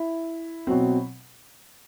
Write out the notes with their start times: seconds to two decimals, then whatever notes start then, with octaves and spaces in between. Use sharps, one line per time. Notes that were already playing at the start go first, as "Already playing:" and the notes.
Already playing: E4
0.67 B2 F#3 C4